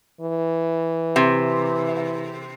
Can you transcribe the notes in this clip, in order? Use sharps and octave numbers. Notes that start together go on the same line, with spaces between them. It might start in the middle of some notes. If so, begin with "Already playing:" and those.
E3
C3